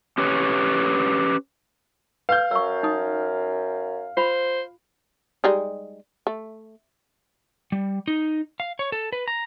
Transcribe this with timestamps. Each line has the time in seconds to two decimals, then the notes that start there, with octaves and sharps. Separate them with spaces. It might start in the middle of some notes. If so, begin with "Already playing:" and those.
0.18 C#4 G4 B4 C#5
2.29 B4 F5 G6
2.51 F#2 C#6 E6
2.83 D#4 D#6
4.17 F4 C5 B5
5.44 G3 G#3 D#4
6.27 A3
7.72 G3
8.08 D#4
8.60 F5
8.79 C#5
8.92 A4
9.12 B4
9.28 A#5